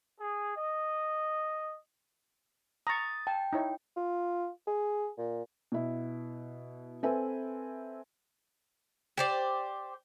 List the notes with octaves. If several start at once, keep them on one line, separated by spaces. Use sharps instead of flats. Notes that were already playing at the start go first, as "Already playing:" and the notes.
G#4
D#5
A#5 C#6 D#6 A6
G5 A5
D#4 E4 C#5
F4
G#4
A#2
B2 E4
C4 A4 B4 E5 G#5
G4 C5 D5